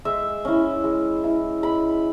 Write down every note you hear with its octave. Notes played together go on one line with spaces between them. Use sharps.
G#3 E5
C#4 E4
G#3
E4
G#3 B5